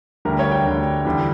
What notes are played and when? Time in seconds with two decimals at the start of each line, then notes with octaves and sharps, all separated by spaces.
0.25 D2 D3 G3 A#4
0.39 C#5
0.51 G5
0.65 D2 D3 G3
1.05 E2 D3 G3